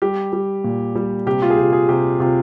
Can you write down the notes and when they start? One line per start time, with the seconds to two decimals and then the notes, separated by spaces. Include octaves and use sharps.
0.02 G3 G4
0.33 G3
0.64 A#2
0.96 G3
1.26 C3 G4
1.42 F4
1.50 G#4
1.58 C3 G4
1.73 G#4
1.89 C3 G4
2.20 C3 F4